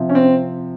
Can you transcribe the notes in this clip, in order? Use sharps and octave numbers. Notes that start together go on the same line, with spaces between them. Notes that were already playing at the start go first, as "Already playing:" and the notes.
Already playing: C3 F3
C#4
C4